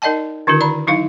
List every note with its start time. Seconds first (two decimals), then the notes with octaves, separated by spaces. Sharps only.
0.02 D#4 A#4 D5 D#5 G5 A5
0.47 D3 D#3 D4 E4 F#4 A#4
0.61 D5 A#5 B5
0.87 F#3 D#4 E4 F5